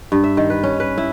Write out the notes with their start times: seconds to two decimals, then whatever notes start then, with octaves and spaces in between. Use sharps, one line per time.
0.12 G2
0.24 E5
0.37 D#3
0.50 B4
0.63 C#4
0.80 B4
0.98 E4